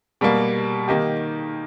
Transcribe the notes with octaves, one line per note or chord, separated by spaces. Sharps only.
B2 G3 A#3
D#3 A#3 D#4 G4